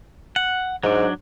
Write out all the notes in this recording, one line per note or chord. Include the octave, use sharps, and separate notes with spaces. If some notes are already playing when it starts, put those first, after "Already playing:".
F#5
G#2 F#3 D4